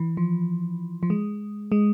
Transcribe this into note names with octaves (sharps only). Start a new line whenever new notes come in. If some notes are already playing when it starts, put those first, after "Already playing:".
Already playing: E3
F3
F3
G#3
G#3